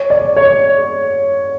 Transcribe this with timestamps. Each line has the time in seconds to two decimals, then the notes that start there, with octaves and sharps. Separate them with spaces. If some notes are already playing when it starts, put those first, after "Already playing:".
Already playing: C#5
0.10 D5
0.36 C#5